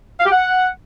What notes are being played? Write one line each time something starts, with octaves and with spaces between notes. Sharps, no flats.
F5
G4
F#5